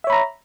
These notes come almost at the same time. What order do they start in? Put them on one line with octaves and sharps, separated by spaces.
E5 C#5 B5 A#5